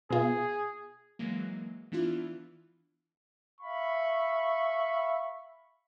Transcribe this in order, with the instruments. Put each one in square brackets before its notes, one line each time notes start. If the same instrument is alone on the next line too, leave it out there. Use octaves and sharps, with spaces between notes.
[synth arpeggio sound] B2 F4 [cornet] G#4
[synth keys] E3 F#3 G#3 A#3
E3 B3 D4 E4 F4
[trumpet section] E5 F5 B5 C#6